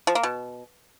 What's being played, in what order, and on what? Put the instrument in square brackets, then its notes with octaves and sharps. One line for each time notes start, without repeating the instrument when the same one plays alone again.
[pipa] F3
A#3
B2